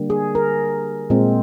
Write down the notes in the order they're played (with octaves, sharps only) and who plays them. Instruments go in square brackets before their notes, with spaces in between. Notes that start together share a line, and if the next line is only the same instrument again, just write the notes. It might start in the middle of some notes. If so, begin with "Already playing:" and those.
Already playing: [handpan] D3 G3 A#3
G#4
A#4
A#2 G#3 C4